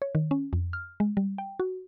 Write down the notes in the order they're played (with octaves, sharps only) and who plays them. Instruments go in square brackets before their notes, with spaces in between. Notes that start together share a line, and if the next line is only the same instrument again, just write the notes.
[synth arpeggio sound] C#5
D#3
C#4
F2
F6
G#3
G3
G5
F#4